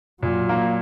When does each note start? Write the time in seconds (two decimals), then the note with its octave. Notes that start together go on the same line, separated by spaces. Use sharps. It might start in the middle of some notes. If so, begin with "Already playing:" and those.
0.22 A#2 F#3
0.49 A#3